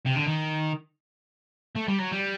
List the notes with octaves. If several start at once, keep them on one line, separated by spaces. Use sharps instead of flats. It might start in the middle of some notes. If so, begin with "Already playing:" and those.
C3
D3
D#3
A3
G3
F#3
G3